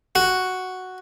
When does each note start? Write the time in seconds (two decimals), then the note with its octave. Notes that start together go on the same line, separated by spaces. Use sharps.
0.15 F#4